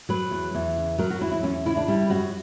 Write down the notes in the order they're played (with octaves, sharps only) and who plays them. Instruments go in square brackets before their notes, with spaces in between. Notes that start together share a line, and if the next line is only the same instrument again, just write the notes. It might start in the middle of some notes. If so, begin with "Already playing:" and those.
[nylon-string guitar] F#3 B4
E2
E2
C#3
F#3 A#4
F#4
E2 E4
E4
E2 C#4
C#3 E4
D4
G3 E4
F#2 F#4